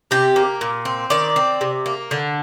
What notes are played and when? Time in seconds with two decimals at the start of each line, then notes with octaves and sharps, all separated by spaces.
0.11 C3 G4
0.36 A#3
0.61 A#2
0.85 C4
1.10 D#3 D5
1.36 C4
1.61 C3
1.86 A#3
2.11 D3